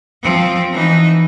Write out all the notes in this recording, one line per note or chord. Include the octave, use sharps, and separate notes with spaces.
F3 C4
E3 D#4